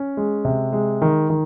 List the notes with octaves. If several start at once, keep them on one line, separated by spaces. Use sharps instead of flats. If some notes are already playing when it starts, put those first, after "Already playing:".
Already playing: C#4
G#3
C3
G#3
D#3
D#3